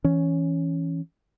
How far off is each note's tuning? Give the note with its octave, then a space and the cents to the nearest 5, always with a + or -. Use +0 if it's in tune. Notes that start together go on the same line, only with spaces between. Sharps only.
E3 +0 C#4 +0